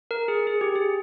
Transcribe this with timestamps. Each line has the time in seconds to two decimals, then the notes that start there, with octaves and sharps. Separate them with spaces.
0.11 A#4
0.28 G#4
0.47 G#4
0.61 G4
0.76 G#4